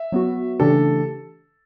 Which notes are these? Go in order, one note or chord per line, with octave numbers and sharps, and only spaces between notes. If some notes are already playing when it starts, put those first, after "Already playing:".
Already playing: E5
F#3 B3 F#4
C#3 E3 A3 D4 G4 A4